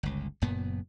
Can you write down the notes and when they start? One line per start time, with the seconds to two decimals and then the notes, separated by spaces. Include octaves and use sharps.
0.03 G1 C#2
0.42 F#1 F#2 A#2 B3